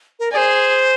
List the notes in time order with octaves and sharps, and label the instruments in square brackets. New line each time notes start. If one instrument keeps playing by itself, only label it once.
[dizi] A#4
[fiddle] G#4 [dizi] D5
[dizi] C5